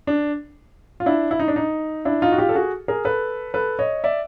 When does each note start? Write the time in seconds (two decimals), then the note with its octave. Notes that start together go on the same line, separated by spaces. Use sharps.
0.07 D4
1.00 F4
1.06 D4 E4
1.31 E4
1.39 D#4
1.48 D4
1.56 D#4
2.05 D4 E4
2.22 D#4 F4
2.32 F#4
2.38 F4 G4
2.49 A4
2.55 F#4 G#4
2.88 G#4 A#4
3.05 A4 B4
3.54 A4 B4
3.79 C#5 D#5
4.04 D5 E5